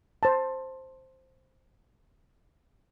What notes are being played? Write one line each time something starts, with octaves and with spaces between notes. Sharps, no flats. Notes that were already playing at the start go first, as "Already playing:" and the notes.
C5 A5